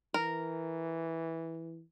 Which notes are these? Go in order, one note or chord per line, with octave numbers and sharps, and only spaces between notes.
E3 A#4